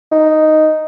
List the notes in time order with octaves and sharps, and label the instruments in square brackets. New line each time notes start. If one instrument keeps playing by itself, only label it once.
[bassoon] D#4